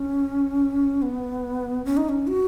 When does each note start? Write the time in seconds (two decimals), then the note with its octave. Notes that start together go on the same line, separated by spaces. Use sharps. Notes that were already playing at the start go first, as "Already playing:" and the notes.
Already playing: C#4
1.02 B3
1.85 C#4
1.97 D#4
2.09 C#4
2.27 F#4